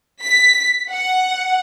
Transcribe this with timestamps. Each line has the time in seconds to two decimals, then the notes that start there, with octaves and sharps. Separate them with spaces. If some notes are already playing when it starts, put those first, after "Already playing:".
0.24 B6
0.90 F#5